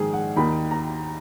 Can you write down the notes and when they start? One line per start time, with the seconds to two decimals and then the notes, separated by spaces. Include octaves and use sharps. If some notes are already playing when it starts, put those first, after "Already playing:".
Already playing: A#1 G#2 D#3 G#4
0.13 F#5
0.36 D#2 D#3 B5
0.71 A#5